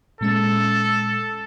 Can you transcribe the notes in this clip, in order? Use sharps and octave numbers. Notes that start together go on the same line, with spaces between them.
A#2 G#3 C#4 A4